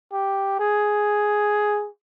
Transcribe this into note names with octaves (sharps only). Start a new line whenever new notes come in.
G4
G#4